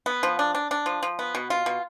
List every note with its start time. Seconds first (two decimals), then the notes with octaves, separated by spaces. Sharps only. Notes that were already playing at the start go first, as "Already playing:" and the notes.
0.06 B3
0.23 F3
0.39 D4
0.55 D4
0.71 D4
0.86 F3
1.03 F3
1.19 B3
1.35 B2
1.50 F4
1.66 B2